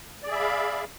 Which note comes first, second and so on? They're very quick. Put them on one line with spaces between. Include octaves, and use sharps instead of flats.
D5 G#4 E5 B5 F5